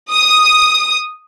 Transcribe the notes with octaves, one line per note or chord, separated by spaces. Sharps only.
D#6